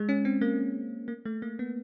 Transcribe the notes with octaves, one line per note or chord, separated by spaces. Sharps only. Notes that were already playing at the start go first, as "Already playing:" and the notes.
Already playing: G#3
C#4
C4
A#3
A#3
A3
A#3
B3